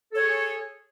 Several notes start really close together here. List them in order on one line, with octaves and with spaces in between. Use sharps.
A4 C#5 G#4